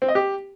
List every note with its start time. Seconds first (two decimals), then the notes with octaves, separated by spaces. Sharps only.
0.02 C4
0.08 D#5
0.15 G4